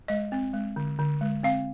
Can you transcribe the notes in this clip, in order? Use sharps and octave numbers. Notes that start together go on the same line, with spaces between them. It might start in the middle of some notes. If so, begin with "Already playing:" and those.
G#3 D#5
C4
G#3
D3
D3
G#3
C4 F5